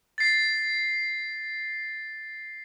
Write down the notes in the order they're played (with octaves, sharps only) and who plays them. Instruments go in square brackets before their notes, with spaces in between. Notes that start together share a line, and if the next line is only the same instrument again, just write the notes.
[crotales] A6 C7